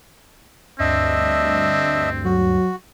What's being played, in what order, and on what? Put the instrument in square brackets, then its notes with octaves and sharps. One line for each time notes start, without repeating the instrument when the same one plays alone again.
[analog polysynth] D2 G2 [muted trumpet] C4 [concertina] D4 D#5 E5
[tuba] F#3 [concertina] F#4